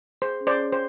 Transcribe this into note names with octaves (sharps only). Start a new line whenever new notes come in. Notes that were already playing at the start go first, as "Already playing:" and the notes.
G#4 C5
C#4
C5 D5
C#5
C5